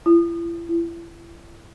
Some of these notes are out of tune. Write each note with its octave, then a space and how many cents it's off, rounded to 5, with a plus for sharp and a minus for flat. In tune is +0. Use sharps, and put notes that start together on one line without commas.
E4 +45
E4 +40